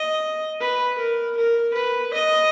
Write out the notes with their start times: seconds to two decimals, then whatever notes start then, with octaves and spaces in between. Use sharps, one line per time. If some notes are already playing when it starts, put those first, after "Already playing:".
Already playing: D#5
0.60 B4
0.98 A#4
1.37 A#4
1.74 B4
2.13 D#5